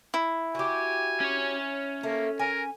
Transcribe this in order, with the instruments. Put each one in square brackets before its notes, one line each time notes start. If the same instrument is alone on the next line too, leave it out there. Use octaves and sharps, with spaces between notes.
[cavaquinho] E4
[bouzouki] F#4 G4 [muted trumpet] G#5
[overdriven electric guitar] C#4 C#5
[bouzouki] A3 [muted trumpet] A#3
[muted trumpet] A#4 [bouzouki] G#5